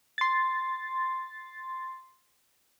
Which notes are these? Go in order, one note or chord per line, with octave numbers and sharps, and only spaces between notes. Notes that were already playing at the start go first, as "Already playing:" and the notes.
C6 A6